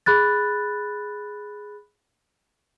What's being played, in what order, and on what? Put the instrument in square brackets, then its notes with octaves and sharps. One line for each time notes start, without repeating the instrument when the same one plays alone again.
[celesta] G#4 B5 F#6 A6